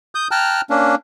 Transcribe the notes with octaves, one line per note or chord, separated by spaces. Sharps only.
D#6 G6
G5 A5 A#5 F6 F#6
A#3 C#4 D4